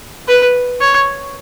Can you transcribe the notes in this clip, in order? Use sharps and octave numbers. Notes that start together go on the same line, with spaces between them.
B4
C#5